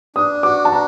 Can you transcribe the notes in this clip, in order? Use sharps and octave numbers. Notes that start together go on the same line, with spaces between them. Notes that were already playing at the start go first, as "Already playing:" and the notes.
D4 D#6
F#4 D6
A5
D4 A#5